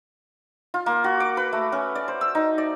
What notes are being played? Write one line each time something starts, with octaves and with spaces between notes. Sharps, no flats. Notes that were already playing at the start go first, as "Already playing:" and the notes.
F4
A#3
F#4
D6
B4
A3
C#4
D5
C5
E6
D#4
D5